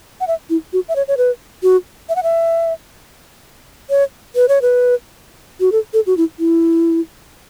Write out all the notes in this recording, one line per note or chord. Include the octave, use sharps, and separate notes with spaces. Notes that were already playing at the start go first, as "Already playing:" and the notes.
F#5
E5
E4
F#4
E5
C#5
C#5
B4
F#4
E5
F#5
E5
C#5
B4
C#5
B4
F#4
A4
A4
F#4
E4
E4